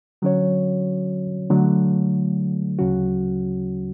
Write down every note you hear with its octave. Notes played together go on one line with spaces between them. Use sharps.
D3 F#3 C#4 F#4 C#5
D3 F#3 A3
D2 C#3 F#3 C#4 F#4